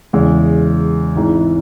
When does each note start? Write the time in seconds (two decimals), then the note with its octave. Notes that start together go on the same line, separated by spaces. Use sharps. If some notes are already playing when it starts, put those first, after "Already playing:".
0.13 E2 C#3 G#3
1.16 G#1 G#2 E3